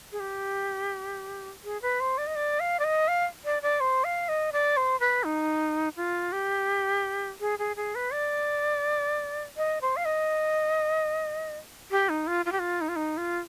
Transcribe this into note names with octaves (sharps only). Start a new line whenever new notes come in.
G#4
G4
G#4
B4
C5
D5
D#5
D5
F5
D5
D#5
F5
D5
D5
C5
F5
D#5
D5
C5
B4
D#4
F4
G4
G#4
G#4
G#4
B4
D5
D#5
C5
F5
D#5
G4
D#4
F4
F4
G4
F4
D#4
F4
D#4
F4